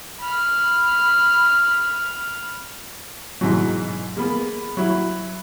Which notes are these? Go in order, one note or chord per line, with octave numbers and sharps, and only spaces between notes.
B5 F6
G#2 B2 E3 F#3
G#3 A#3 B3
F#3 E4